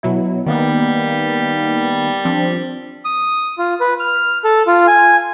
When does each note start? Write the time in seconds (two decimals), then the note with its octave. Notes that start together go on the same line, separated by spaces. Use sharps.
0.03 B2 F#3 E4
0.46 D#3 G3 A#3 B3
2.25 F3 C4 D4
3.05 D#6
3.58 F4
3.80 B4
4.00 F6
4.44 A4
4.67 F4
4.88 G#5